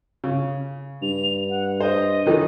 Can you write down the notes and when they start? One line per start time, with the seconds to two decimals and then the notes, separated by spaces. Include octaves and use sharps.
0.24 C#3
1.03 G2 F7
1.50 F#5
1.80 C5 D#5
2.26 D#3 E3 F#3